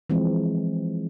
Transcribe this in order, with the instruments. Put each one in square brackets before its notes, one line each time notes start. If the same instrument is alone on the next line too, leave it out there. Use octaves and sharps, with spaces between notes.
[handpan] E3 F3 G#3 C4